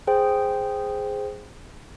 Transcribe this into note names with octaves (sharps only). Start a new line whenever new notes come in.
G#4 C5 G5